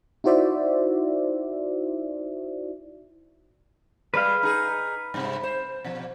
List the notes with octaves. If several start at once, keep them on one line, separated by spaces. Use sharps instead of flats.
D#4 E4 F#4 C5 D5 E5
G3 G#3 B4 F5
D#4 G#4
G2 C3
C5
B2 F3